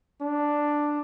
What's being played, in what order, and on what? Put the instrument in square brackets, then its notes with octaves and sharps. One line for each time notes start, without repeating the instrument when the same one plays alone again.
[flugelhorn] D4